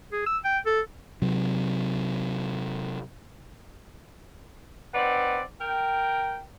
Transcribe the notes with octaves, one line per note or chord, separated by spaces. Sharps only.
G#4
E6
G5
A4
C3 F#3
C4 D#4 B4 D5 F#5
A#4 G5